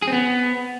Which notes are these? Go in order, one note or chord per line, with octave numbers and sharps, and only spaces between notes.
G#4
C4
B3